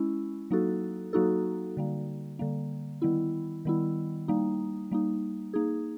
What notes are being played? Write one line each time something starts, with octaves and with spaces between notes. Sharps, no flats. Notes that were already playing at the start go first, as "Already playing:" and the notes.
Already playing: G#3 C#4 E4
F#3 A#3 D#4 F#4 A4
F#3 A#3 D#4 F#4 A4
D3 G3 A#3
D3 G3 A#3
D#3 G3 B3 E4
D#3 G3 B3 E4
G3 A#3 D#4
G3 A#3 D#4
A#3 D#4 G#4